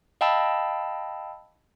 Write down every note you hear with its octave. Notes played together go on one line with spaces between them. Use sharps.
D#5 F5 G5 A5 B5 E6